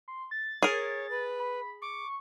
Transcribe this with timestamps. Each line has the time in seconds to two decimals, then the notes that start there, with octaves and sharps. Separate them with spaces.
0.08 C6
0.31 A6
0.63 G#4 A#4 C#5
1.10 B4
1.40 B5
1.82 C#6 D6